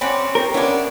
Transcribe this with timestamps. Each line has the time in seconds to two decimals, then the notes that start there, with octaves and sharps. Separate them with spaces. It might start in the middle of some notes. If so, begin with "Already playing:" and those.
0.01 C4 C#4 D5 F#5 B5
0.35 G4 A#4 C5 A#5
0.54 B3 C#4 D4 E4 C#5